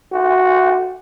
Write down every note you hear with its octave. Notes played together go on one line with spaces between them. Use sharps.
F#4